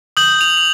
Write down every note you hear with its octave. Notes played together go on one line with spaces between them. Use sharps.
D#6 G6 F#7
F7
F7